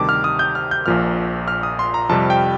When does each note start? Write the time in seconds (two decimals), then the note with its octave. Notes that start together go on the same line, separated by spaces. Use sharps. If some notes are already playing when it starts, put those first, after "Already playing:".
Already playing: D2 C3 D#3 G3 A5 D6
0.09 F6
0.24 D#6
0.39 G6
0.55 F6
0.71 G6
0.86 A#1 A#2 F3 F6
1.48 F6
1.63 D#6
1.79 C6
1.94 A#5
2.09 F2 C3 G3 A5
2.30 G5